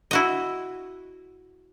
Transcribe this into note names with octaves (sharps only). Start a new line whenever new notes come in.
E4 F#4 D#5